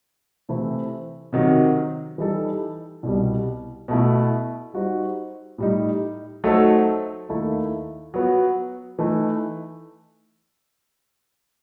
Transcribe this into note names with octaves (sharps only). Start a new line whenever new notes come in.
C3 E3 A3 C4 E4
C3 D#3 F#3
E3 G3 D#4 A4
C2 B2 G3
B2 A3 E4
G3 D#4 F#4 C5
A2 G3 D#4
F#3 A3 D#4 A4 C5
D#2 D#3 A3 E4 A4
F#3 B3 F#4
E3 A3 D#4